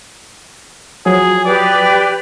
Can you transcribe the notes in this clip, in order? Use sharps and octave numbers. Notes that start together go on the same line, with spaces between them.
F3 F#3 G#4
G4 B4 D5